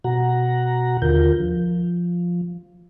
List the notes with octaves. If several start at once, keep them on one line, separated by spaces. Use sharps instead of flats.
B2 F#4 F#5 A#5
D#2 D3 F4 A#4 G6
F3